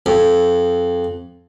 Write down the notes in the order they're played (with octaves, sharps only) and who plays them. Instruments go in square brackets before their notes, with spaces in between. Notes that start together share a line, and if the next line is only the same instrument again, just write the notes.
[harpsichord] F2